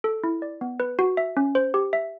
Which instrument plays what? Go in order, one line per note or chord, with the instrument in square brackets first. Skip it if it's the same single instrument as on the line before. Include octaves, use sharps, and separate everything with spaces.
[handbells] A4
E4
D5
B3
B4
F#4
E5
C#4
C5
G4
E5